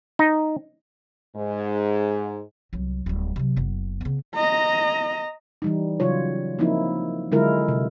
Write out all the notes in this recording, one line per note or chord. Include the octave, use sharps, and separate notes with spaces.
D#4
G#2
C2 F#3
D1 G3
C3 F#3
F#1 B3
C#3 B3
D#5 A#5
E3 G3 D#4
C#3 F#3 F4 C#5
F3 A#3 C4 D#4 E4
D3 F#3 G#3 E4 F4 A#4
C3